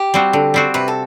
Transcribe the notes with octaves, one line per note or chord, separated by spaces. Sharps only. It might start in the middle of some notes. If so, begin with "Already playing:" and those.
Already playing: G4
G3 C4 F#4
D3
G3 C4 F#4
C3 B4
A4